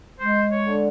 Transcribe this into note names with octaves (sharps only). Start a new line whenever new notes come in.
G#3 C5
C#5
D3